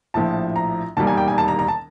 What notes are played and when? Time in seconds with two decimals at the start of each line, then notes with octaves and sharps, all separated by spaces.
0.14 A#1 A2 F3 A5
0.56 A#5
0.97 E1 D#2 D#3 G3 A#3 A5
1.07 G#5
1.17 G5
1.28 G#5
1.38 A5
1.48 A#5
1.59 A#5
1.68 A5